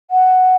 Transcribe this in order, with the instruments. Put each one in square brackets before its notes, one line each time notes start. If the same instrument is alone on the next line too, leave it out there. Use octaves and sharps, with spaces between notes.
[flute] F#5